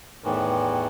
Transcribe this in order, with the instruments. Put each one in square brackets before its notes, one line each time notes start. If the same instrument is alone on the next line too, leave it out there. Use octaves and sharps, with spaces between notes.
[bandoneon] E2 A2 D#3 E3